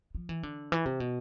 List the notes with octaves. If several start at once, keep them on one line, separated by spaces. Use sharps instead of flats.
F3
E3
D3
E3
C3
B2